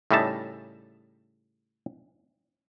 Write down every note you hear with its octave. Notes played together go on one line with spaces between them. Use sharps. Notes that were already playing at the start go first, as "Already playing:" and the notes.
A2 C#3 G3 D#4 E5 A5